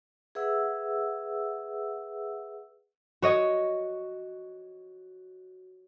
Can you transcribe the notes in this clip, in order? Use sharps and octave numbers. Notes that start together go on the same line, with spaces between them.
G#4 B4 E5 F#5 E6
F#4 C#5 D#5